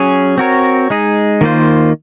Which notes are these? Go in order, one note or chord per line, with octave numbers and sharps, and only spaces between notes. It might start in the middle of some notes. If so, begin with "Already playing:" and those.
Already playing: F#3 C#4 G#4 C#5
C4 F#4 A#4 C#5
G#3 D#4 G#4
D#3 A#3 F4 C5